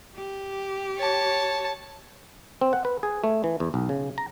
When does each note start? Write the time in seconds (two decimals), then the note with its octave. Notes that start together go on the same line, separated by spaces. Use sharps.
0.15 G4
0.98 C#5 A5
2.61 C4
2.73 F#5
2.85 B4
3.03 G#4
3.24 A3
3.44 E3
3.60 E2
3.74 B1
3.89 C#3
4.18 A#5